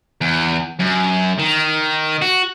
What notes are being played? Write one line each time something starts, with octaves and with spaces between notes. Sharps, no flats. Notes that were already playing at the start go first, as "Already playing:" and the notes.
E2
F#2
D#3
F#4